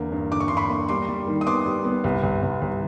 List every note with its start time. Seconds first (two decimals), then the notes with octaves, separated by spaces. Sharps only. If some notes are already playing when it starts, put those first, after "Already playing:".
Already playing: E2 D3 A#3
0.12 G2
0.32 D3 D6
0.40 C#6
0.48 G2 C6
0.57 B5 C#6
0.69 A#3
0.88 G3 C6 D6
1.08 G3
1.27 D#3
1.41 D#6
1.47 B3 C6 D6
1.66 G3
1.85 B3
2.04 C2
2.23 C2
2.42 C2
2.62 C2